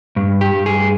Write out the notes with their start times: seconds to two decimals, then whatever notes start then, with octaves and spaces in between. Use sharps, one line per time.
0.16 G2
0.41 G4
0.53 G2
0.66 G#4